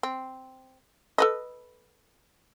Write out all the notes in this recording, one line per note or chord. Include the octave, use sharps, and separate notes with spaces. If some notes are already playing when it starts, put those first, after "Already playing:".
C4
A4 B4 D#5